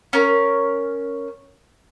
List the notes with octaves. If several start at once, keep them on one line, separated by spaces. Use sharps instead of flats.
C#4 A#4